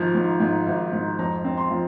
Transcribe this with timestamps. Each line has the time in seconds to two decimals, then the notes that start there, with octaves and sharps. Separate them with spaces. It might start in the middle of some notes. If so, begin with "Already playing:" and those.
Already playing: G#1 F3 A#5
0.14 G#2
0.40 G#2
0.67 G#1
0.92 G#2
1.18 F2 A#5
1.44 C4
1.57 C6
1.71 F3